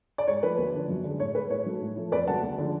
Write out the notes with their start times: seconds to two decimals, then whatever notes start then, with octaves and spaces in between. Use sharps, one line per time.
0.18 D5
0.27 G#2 C#5
0.43 F3 A3 B4
0.58 D2
0.74 D3 F3
0.89 F#2
1.04 D3 G#3
1.20 A2 C#5
1.35 G#3 B4
1.50 A2 C#5
1.66 F#3 A3
1.81 A2
1.96 F3 A3
2.12 F2 B4 D5
2.27 C#3 F#3 A3 F#5 A5
2.43 D2
2.58 D3 F3 G#3